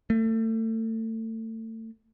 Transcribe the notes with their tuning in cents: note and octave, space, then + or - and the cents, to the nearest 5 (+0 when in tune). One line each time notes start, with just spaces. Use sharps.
A3 +30